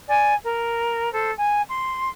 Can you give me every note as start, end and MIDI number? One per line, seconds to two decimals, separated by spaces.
0.08 0.33 74
0.08 0.33 80
0.43 1.11 70
1.11 1.31 69
1.11 1.31 72
1.36 1.61 80
1.69 2.11 84